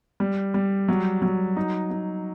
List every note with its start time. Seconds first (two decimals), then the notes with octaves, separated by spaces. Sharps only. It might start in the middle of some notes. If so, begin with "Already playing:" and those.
0.20 G3
0.54 G3
0.88 F#3
1.22 F#3
1.57 D#4
1.90 D#4